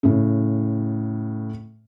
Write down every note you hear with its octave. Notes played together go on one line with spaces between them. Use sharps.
A2 C#3